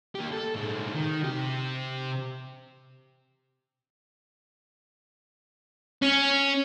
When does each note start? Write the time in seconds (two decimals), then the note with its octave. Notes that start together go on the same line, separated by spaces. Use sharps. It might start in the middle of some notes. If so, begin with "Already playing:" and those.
0.15 A#3 G4
0.33 A4
0.56 A2 G#3
0.96 D#3
1.24 C3 G4
6.02 C#4